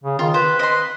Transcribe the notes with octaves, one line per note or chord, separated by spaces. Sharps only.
C#3
D#3 F4
B4 C5
D#5 C6